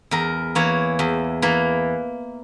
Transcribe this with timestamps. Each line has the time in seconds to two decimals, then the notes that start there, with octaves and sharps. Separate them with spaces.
0.11 E2 A#4
0.55 E3 A#3 C#5
0.99 E2
1.42 E3 A#3